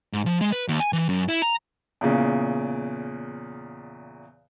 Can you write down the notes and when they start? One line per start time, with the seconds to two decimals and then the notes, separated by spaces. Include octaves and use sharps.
0.13 G#2
0.26 F3
0.41 G#3
0.52 B4
0.68 D#2
0.80 G#5
0.93 E3
1.09 F#2
1.29 E4
1.42 A#5
2.01 E2 A#2 C#3